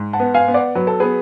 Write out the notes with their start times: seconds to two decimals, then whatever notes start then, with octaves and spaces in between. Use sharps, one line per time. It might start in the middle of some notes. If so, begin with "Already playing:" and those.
Already playing: G#2
0.13 F#5 A5
0.20 B3
0.34 F5 G#5
0.48 B3
0.54 D5 F#5
0.75 F#3 B4
0.87 A4
1.00 B3 G#4 B4